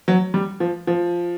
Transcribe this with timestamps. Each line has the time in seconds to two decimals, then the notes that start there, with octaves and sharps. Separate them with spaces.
0.08 F#3
0.34 G3
0.60 F3
0.87 F3